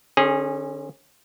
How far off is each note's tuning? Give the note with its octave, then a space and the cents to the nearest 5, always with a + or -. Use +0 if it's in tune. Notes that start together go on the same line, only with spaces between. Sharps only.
D3 +20 C#4 -25 G#4 -10